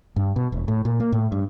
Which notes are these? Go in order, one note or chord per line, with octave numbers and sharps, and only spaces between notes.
G2
B2
E1
A2
A#2
A#3
A2
G2